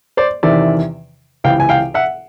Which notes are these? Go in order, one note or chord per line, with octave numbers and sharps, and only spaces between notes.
C5 D5
E2 C3 D#3 D5 E5
C#2 C3 E3 F5 G5
G#5
F5 G5
E5 F#5